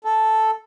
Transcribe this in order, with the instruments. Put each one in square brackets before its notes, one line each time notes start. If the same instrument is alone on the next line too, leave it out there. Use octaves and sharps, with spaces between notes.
[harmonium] A4